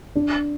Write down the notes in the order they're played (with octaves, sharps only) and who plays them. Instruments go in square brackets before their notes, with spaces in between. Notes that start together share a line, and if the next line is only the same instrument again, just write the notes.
[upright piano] D4